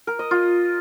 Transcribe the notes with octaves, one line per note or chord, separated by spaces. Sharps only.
A#4
D#5
F4